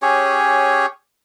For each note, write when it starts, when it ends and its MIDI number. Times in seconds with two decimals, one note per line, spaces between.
0.02 0.86 61
0.02 0.86 67
0.02 0.86 68
0.02 0.86 73